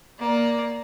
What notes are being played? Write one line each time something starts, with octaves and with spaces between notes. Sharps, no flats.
A#3 D5